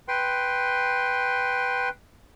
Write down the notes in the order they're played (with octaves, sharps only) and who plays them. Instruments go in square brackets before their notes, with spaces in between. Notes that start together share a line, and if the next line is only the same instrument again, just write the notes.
[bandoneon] B4 G5 C6